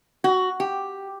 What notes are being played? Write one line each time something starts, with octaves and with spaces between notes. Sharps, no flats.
F#4
G4